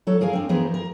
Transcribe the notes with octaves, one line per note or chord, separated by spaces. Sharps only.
F#3 A4 C#5
G#4 A#4 F5 G#5
C4 D4
E3 F3 B3 G#4 A#4 C5
A#4